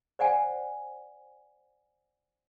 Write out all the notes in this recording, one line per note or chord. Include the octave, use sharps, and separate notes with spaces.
C5 D5 F#5 G#5